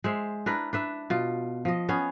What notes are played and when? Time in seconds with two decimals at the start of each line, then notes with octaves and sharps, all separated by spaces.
0.04 G#3 C5 E5
0.46 D4 E4 A#4 B4
0.73 D4 B4 E5
1.10 B2 F4
1.65 F3 D#5
1.89 B3 C#4 G#4